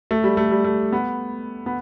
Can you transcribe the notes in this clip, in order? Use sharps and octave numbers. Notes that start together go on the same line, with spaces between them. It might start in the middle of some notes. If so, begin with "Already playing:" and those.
A3
G3
A3
G3
A3
B3
B3